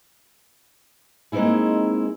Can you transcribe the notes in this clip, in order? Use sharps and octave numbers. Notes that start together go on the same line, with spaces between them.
G#3 A#3 C4 D#4 E4 G#4